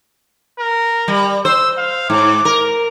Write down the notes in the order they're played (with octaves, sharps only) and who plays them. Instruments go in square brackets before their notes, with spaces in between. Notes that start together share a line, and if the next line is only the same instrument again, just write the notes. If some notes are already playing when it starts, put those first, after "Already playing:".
[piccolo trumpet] A#4
[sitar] G3
[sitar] C5 [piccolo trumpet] E6
[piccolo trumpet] F5
[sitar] G#2 [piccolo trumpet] D6
[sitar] A#4